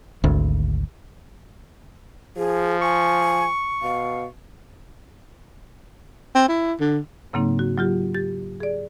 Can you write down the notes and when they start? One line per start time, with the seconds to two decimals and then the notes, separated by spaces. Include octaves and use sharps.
0.24 G#1 D2
2.37 F3 G#4
2.82 G#5 C#6
3.82 B2 F5
6.35 C4
6.49 E4
6.80 D3
7.33 G#2 C#3 F#3 A#3 C4 D#4
7.59 F#4
7.78 F#3 F4 G4
8.14 G4 A6
8.60 G#4 D5